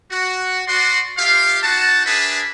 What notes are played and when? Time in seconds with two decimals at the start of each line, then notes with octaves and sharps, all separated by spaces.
0.11 F#4
0.67 F#4 D5 C6
1.18 F4 G4 E5 F5
1.63 D#4 F#4 F#5 A5
2.06 D4 G#4 A#4 B4 E5 A5